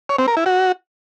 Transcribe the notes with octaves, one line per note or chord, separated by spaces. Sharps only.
C#5
C4
A#4
E4
F#4